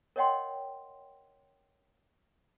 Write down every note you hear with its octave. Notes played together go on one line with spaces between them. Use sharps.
A#4 C#5 D#5 F#5 G5 C6